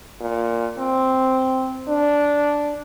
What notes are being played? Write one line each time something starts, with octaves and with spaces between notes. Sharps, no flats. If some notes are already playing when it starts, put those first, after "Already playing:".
A#2
C4
D4